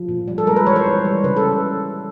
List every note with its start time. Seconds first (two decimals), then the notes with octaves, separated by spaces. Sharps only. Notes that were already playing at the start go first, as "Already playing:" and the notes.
Already playing: F3
0.08 A#2
0.28 G3
0.38 A4
0.47 G#3 A#4
0.56 B4
0.66 E3 C#5
0.76 C5
0.86 G3
1.05 G3
1.24 C#3 B4
1.37 A4